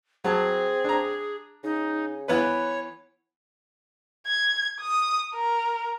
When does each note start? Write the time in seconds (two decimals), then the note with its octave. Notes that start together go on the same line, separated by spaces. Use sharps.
0.24 F#3 C4 G#4 A5
0.84 D4 A#5
1.64 C#3 D#4
2.28 E3 B3 B4 C#5
4.27 G#6
4.81 D#6
5.34 A#4